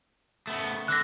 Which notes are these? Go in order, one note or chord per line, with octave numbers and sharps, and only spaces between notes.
A3 B3
D3 F#6 A#6